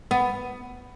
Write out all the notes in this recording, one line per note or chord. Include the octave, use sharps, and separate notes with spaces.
B3